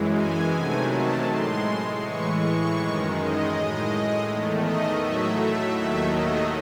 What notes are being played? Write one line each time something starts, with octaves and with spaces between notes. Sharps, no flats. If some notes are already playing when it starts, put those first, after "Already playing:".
Already playing: F#2 E3 G#3
G#5
C3 D#3 F#3 A3 G#5
A5
A2 G#3 C6
A2 E3 G#3 C#6
C#6
F#2 D#3 G#3
D#5
A2 G#3
E2 D#3 A3
D#5
A2 F#3 A3 E5
E5
D#2 D#3 F#3 A3 E5
D#5